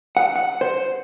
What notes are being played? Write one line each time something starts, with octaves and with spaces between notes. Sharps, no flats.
F#5
F#5
C5